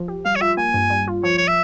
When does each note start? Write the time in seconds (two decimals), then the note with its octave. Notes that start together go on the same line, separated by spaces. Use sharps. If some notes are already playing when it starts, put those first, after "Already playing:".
Already playing: F3
0.08 G4
0.25 G3 F5
0.36 C#5
0.41 F4 E5
0.57 A#3 G#5
0.74 G2
0.90 G3
1.08 F4
1.23 F3 C#5
1.38 C#5
1.48 E5